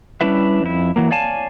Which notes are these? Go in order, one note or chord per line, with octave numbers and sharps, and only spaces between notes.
G3 C#4 D4 E4 B4 E5
F2 E4
E3 F#3 A#3
C#5 D5 F5 G#5 A5